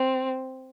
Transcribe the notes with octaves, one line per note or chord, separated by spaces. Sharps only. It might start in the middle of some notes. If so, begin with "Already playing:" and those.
Already playing: C4